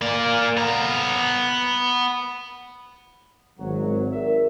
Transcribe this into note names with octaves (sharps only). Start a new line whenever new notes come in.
A#3 D5
B3 A#5
G#1 F#3
G#4 A#4 D5 E5